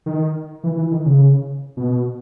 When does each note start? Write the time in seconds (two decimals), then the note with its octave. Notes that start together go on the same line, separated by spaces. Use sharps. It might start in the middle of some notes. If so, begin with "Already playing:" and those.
0.06 D#3
0.64 E3
0.78 E3
0.92 D#3
1.06 C#3
1.77 B2